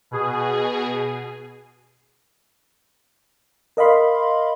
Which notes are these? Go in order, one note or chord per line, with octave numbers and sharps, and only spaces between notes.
B2 G#4
A#4 D#5 F5 B5 C6